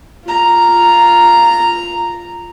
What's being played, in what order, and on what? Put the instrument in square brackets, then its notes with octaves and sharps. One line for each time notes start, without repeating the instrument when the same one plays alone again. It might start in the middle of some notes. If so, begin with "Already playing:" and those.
[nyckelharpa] F4 A#5